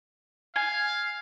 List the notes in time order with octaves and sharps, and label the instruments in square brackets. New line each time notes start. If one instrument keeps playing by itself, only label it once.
[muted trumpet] F5 [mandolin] G#5